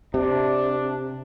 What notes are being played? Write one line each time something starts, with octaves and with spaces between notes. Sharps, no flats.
C3 D4